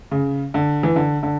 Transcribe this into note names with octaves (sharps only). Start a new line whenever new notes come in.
C#3
D3
E3
D3
D3